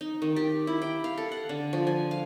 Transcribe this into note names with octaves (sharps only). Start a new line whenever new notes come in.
D#4
D#3
G4
E4
G5
F5
A4
F#5
D3
F3
G#5
F5